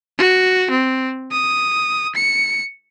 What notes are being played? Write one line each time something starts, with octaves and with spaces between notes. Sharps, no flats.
F#4
C4
D#6
C#7